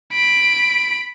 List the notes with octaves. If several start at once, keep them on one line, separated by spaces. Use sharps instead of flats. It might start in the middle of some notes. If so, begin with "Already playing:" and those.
B5 D7